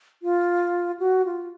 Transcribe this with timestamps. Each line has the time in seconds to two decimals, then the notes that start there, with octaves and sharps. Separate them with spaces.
0.23 F4
0.99 F#4
1.25 F4